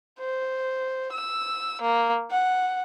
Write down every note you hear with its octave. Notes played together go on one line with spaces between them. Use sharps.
C5
E6
A#3
F#5